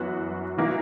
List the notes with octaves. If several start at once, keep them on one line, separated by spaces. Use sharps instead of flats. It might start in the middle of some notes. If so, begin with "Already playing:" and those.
Already playing: F#2 E3 B3 F#4
E3 A#3 D#4 F#4